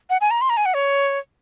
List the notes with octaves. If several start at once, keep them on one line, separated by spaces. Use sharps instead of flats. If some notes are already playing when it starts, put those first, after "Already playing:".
F#5
G#5
A#5
C6
A#5
G#5
F#5
C#5